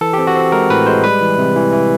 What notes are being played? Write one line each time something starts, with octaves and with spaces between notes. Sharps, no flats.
E3 A4
C4 G4
F#4
C4
G#3 A#4
A2 B4
G#3 C5
G3 B4
E3
C3
E3
E3